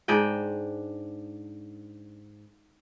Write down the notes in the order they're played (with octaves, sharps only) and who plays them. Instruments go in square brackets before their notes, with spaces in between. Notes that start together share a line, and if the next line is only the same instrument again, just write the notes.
[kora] G#2 D4 D#5 G5